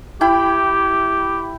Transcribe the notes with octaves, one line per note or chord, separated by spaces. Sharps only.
E4 G4 G5 B5